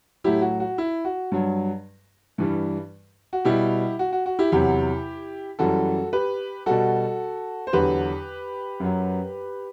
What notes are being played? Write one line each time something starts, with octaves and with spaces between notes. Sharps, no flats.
A2 F#3 E4 G4
F#4
F#4
E4
F#4
G2 F#3
G2 E3 G3
F#4
B2 G3 E4 G4
F#4
F#4
F#4
E4 G4
E2 C3 F#3 E4 G4
F#2 E3 G3 F#4 A4
G4 B4
B2 G3 F#4 A4
C5
E2 D3 F#3 G4 B4
F#2 F#3